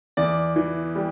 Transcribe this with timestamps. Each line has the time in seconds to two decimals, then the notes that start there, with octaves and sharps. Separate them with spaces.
0.17 E2 D5
0.56 E3
0.95 G3